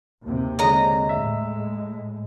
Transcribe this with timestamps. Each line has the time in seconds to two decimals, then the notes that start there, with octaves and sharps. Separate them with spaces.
0.22 D#2 C3
0.59 D3 G#3 C#5 D#5 A#5
1.09 A2 G#3 E5